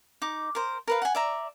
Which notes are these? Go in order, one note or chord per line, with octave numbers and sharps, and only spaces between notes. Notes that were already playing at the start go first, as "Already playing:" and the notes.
D#4 D6
A#4 C5
A#4 B4 F5
F#5 G#5
D5 E5 A#5